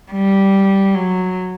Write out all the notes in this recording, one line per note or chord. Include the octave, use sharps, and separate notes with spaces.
G3
F#3